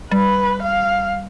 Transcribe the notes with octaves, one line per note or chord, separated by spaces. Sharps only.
G3 B4
F5